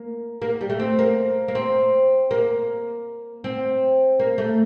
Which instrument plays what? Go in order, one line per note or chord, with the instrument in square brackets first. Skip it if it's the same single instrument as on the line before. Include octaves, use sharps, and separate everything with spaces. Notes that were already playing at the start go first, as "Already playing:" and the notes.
Already playing: [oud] A#3
A#3
G3
A3
C4
A#3
A#3
C4
A#3
C4
A#3
A3